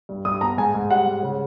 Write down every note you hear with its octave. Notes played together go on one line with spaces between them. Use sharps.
G2
G2 D#6
B3 A#5
G#2 G#5
G#2
G3 F#5
G#2
C#3